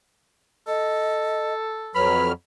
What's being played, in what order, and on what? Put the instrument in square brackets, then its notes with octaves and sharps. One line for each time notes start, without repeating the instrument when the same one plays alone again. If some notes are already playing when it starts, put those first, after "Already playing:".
[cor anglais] A4 [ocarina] D#5
[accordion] F2 F#3 F6 [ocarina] B4 [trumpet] B5